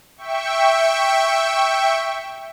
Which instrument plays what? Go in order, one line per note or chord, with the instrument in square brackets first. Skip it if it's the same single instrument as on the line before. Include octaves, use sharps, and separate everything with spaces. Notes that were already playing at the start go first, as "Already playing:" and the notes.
[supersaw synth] E5 G5 C#6